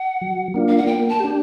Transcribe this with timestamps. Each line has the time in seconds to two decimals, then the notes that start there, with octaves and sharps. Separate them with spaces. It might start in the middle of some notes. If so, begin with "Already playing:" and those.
Already playing: F#5
0.21 F#3
0.54 A#3 D4 F4
0.69 F5
0.78 F#5
0.87 A#3 G5
1.09 A5
1.20 D4 G4